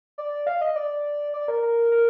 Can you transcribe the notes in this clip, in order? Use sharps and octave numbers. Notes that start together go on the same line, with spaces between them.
D5
F5
D#5
D5
D5
A#4
A#4
A#4